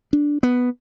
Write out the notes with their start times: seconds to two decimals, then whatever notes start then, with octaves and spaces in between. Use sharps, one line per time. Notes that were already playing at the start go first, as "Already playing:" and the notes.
0.13 D4
0.43 B3